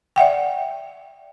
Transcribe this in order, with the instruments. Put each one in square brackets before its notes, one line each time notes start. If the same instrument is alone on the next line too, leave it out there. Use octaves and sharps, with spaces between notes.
[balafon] D5 E5 F#5 G5